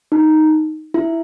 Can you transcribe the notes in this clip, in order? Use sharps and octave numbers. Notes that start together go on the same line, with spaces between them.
D#4
E4